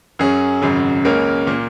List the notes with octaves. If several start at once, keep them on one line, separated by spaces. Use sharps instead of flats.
F#2 F#3 C#4 G#4
G#1 F#2 C#3 F#3
C#2 C#3 A#3 C#4 A#4
A#2 A#3